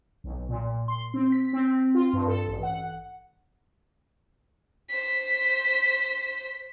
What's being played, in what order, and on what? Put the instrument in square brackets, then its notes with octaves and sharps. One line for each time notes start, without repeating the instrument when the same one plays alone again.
[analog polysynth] B1
A#2
C6
C4
B6
C4
F4
G2
A4
A1
F#5
[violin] C5 B6